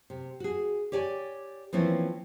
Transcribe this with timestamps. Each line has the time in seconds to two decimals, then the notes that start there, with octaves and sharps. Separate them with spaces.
0.10 C3
0.40 F#4 G#4
0.92 G4 C#5 D5 G#5
1.73 E3 F3 A#3 C4 C#4 E4